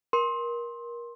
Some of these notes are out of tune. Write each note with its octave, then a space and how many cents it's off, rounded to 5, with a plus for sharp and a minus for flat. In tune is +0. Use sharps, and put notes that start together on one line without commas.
A#4 +25 C6 +15